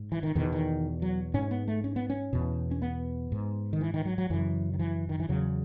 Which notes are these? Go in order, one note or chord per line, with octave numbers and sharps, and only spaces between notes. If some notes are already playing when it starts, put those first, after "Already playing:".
Already playing: G#2
E3
D#3
E2 B2 D#3
D#3
F#3
G#2 C#4
B3
A3
C#4
B3
C#4
E2 B2
C#4
B3
G#2
D#3
E3
D#3
F#3
F#3
F#2 C#3 E3
D#3
E3
D#3
E3
E2 C#3 F#3